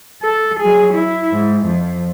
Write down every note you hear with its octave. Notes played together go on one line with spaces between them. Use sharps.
A4
F#3 G#4
E4
G#2
F2